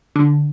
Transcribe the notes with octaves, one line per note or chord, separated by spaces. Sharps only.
D3